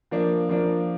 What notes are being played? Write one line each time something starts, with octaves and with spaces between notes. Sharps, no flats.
F3 A#3 D4
F3 A#3 D4